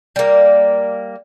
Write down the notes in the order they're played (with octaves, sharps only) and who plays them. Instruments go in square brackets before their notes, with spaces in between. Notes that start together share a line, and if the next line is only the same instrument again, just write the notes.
[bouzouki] G3 A#3